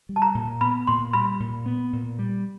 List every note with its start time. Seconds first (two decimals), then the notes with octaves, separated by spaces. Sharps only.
0.09 G3
0.16 A5
0.22 A#5
0.35 A#2
0.61 B3 B5
0.87 A#2 C6
1.13 G3 B5
1.40 A#2
1.66 B3
1.93 A#2
2.19 G3